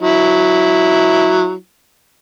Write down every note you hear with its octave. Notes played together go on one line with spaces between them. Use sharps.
F#3 E4